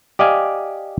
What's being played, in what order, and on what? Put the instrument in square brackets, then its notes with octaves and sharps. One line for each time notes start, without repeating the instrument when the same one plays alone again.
[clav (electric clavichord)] G4 D5 D#5 F5 G#5